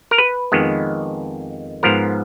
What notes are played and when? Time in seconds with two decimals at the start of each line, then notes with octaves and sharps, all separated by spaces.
0.11 A#4
0.18 B4
0.52 F2 D#3 G#3 B3
1.83 G#2 F3 B3 A#4